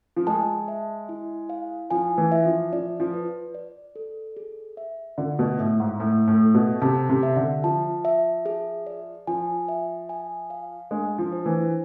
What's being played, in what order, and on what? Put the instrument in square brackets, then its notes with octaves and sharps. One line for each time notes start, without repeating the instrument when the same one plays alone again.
[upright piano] F3
[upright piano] G#3 [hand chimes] A5
[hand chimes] E5
E4
F5
[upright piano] F3 [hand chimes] G#5
[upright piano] E3
[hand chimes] E5
[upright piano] F3
[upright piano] F3 [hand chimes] D5
[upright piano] F3
[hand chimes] B4
D5
A4
G#4
E5
[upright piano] D3 [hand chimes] F4
[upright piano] B2
[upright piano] A2 [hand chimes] E5
[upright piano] G#2
[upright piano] A2 [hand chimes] E5
[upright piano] A2
[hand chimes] A4
[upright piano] B2
[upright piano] C3 [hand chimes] A5
[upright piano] C3
[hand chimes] E5
[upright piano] D3
[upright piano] F3 [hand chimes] A5
[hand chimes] E5
G#4
D5
[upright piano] F3 [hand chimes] G#5
[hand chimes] E5
G#5
F5
[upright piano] G#3 [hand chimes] D4
[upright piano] F3
[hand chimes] C5
[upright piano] E3